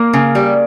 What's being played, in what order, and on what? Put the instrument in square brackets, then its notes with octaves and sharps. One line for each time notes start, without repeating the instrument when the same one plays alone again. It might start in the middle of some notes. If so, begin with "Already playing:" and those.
Already playing: [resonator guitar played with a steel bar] A#3
C#3
G3